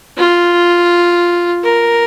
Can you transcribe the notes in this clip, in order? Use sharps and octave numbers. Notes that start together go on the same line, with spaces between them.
F4
A#4